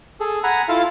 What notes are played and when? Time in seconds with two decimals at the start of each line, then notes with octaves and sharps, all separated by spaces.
0.20 G#4 A4
0.44 F#5 G#5 A#5 B5
0.69 E4 F4 A4 F5 A5